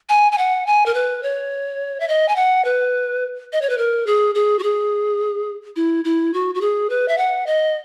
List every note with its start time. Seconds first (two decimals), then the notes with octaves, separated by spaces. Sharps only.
0.09 G#5
0.32 G#5
0.38 F#5
0.67 G#5
0.86 A#4
0.94 B4
1.23 C#5
2.00 E5
2.08 D#5
2.29 G#5
2.36 F#5
2.65 B4
3.53 D#5
3.62 C#5
3.70 B4
3.78 A#4
4.07 G#4
4.35 G#4
4.59 F#4
4.63 G#4
5.76 E4
6.04 E4
6.34 F#4
6.55 F#4
6.61 G#4
6.90 B4
7.08 E5
7.18 F#5
7.47 D#5